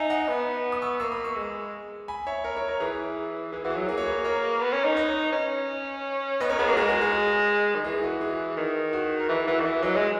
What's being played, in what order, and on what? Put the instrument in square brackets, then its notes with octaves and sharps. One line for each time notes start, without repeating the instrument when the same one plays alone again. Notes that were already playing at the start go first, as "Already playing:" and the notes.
Already playing: [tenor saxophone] D#4 [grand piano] E5 G#5
[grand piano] D#5 F#5
[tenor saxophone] B3
[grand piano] D#6
C#6 E6
[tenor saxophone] A#3 [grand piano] C#6 E6
[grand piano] B5 D#6
C#6 E6
[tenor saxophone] G#3
[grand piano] G#5 B5
C#5 E5
A#4 C#5
A#4 C#5
A#4 C#5
[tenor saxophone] E3 [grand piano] G#4 B4
[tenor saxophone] E3 [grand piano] G#4
[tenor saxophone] E3 [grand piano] F#4
[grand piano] G#4
[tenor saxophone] F#3
[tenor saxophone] A#3 [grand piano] G#4
[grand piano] C#5
G#4 B4
A#4 C#5
[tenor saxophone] B3
C#4
D#4
[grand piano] B4 D#5
[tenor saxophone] C#4
[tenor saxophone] B3 [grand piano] B4 D#5
[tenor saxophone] C#4 [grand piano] A#4 C#5
[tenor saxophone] B3 [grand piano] G#4 B4
[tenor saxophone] A#3 [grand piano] F#4 A#4
[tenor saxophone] G#3 [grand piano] G#4
[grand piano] F#4
G#4
G#4
[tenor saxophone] D#3
[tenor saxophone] E3 [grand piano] G#4
[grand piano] F#4
G#4
[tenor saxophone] D#3
[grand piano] F#4
A#4
[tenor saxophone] E3 [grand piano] G#4
[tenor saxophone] E3 [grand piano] F#4
[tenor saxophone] D#3
[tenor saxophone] E3 [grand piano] G#4
[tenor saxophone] F#3 [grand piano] B4 D#5
[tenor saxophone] G#3